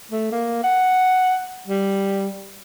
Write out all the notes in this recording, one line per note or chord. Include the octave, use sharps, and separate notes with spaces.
A3
A#3
F#5
G3